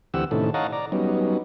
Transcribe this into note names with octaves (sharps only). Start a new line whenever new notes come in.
D2 E3 C4 G4 F#5 E6
A2 C3 D#3 C#4 E4 A4
C#5 D#5 F5 F#5 A5 A#5
D5 A#5
F#3 G3 B3 C#4 D#4